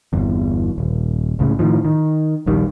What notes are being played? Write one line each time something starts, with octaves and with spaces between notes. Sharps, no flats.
G1 E2
D#1
C#2 A2 C#3
A2 D#3 F3
D#3
D#1 A#1 D#3 G3